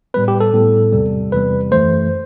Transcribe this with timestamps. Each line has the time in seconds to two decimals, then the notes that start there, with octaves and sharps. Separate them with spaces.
0.14 A2 G3 B3 B4
0.28 G4
0.40 A4
0.54 A2 G3 B3
0.92 E2 C3 G3
1.32 E2 C3 G3 B4
1.71 F#2 E3 A3 C5